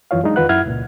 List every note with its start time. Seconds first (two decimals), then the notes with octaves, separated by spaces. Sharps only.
0.11 F#2 E3 F4 C#5 F5
0.23 F#3 G#3 D4 D#4
0.36 E2 D#3 F4 B4 F#5 F#6
0.49 F#2 E4 F#5 F6 G#6
0.66 C#2 A#2